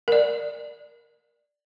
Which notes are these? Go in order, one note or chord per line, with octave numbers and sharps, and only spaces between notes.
A#4 D5